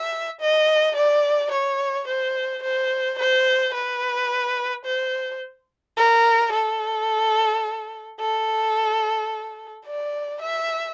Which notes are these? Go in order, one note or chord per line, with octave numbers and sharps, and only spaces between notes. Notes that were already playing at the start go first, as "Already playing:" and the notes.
Already playing: E5
D#5
D5
C#5
C5
C5
C5
B4
C5
A#4
A4
A4
D5
E5